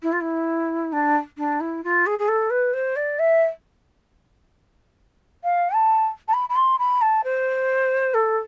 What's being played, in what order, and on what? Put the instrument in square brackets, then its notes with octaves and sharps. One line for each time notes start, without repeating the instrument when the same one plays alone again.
[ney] E4
F4
E4
D4
D4
E4
F4
G#4
G#4
A4
B4
C5
D5
E5
F5
A5
A5
B5
B5
C6
B5
A5
C5
A4